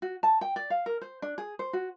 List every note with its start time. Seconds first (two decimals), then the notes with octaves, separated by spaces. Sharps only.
0.02 F#4
0.23 A5
0.41 G5
0.56 D5
0.70 F5
0.86 A#4
1.01 C5
1.22 D4
1.38 G#4
1.59 C5
1.73 F#4